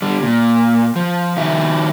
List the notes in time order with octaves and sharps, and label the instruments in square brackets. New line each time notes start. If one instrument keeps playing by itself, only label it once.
[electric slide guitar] D3 G3
A#2
F3
D#3 F3 D#4 F#4 E5